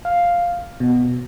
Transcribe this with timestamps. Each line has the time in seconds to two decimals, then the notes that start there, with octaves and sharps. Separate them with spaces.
0.05 F5
0.80 B2